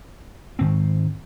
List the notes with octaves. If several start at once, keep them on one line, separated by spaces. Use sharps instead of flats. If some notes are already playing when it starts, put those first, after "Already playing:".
G#2 D#3 G#3 C4